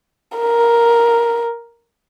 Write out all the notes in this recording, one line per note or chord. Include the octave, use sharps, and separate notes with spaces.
A#4